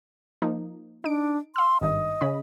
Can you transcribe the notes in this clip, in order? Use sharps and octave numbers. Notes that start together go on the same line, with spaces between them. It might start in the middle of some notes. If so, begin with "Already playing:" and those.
F3 A#3 D#4
D4 D#4 D7
F5 C6 E6
G#1 G2 D#3 D#5
C#3 C#4 B5